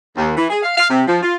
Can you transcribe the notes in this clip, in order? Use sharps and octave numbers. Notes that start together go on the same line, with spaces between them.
D#2
E3
G#4
F5
F5
C3
F3
F4